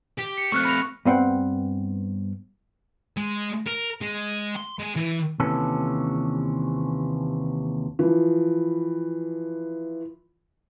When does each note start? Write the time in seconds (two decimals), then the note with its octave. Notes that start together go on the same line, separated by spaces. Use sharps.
0.18 G4
0.37 C#7
0.52 A3 C4 C#6 F6 F#6
0.65 B5 A#6 F7
1.05 G2 B3 C4 F#5 G5
3.17 G#3
3.67 A#4
4.01 G#3
4.56 C6
4.79 G#3
4.96 E3
5.40 D#2 C3 E3 C#4 A4
7.99 E3 F3